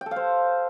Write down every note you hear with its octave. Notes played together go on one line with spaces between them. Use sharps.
G5
A4
F5
C5